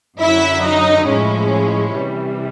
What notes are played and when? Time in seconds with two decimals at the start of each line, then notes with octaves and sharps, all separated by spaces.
0.20 F#2 D3 F#3 E4 E5
0.64 D#4 D#5
1.07 A2 F3 G#3 C#4 E4
1.95 C3 E3 G3